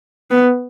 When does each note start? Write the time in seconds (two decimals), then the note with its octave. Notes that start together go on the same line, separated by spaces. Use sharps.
0.31 B3